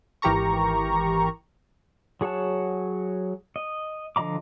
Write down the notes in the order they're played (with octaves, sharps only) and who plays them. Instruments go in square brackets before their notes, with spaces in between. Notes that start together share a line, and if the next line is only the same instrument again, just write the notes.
[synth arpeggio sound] G#1 E3 G4 A#4 A#5 C#6
[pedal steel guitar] F#3 G#4 C#5 F#5 A5
D#5
D3 F3 D#5 A#5 D6